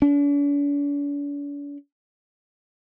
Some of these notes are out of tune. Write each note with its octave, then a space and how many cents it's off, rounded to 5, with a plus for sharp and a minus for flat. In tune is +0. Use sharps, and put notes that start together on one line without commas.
D4 -45